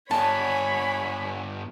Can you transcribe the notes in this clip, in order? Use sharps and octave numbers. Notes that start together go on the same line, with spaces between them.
G2 B3 C#5 G#5 A5 B5